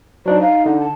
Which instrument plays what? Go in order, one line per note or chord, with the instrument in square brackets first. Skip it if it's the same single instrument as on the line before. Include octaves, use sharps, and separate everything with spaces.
[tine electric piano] F#3 D4 D#4 [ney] C5
[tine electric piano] D#4 [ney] F5
[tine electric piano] D3 [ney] D#4
[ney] A5